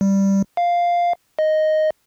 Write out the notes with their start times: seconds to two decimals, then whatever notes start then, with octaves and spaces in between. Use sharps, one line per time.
0.01 G3
0.57 F5
1.39 D#5